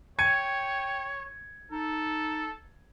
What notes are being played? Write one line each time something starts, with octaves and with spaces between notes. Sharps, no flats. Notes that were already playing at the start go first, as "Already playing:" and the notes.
C#5 G5 G#6 C#7 D#7
D#4 A4